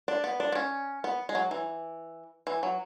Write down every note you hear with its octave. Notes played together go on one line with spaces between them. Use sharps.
D4
B3
D4
B3
C#4
B3
G#3
F#3
E3
E3
F#3